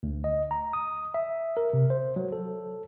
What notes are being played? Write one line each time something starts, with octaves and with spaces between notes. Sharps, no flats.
D2
D#5
A#5
D#6
E5
A#4
C3
C5
F#3
A4